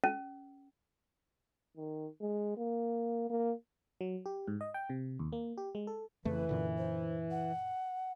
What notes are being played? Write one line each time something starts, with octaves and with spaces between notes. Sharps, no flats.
C#4
D#3
G#3
A#3
A#3
F#3
G4
G#2
D#5
G5
C3
D#2
A#3
G4
G#3
A4
F2 C#3 E3 A3 B4
F#2 A#2 D3
C5
F#5